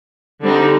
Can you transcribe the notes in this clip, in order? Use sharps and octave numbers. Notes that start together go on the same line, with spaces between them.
D3 G3 C4 D#4